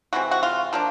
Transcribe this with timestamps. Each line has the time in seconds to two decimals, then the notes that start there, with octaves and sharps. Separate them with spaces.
0.13 C3 E3 G#3 C4 F#4
0.31 F#4
0.43 F4
0.73 F3 A#3 D4